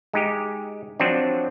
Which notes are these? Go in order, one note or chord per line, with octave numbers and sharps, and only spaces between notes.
G#3 D#4 G4
F3 F#3 C4 D4